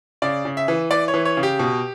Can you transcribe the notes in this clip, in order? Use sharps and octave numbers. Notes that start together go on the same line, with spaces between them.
C#3 D5
C#3
E5
E3
E3 D5
C#5
E3
C#5
C#3
G4
B2